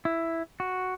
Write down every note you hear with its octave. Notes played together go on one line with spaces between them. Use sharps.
E4
F#4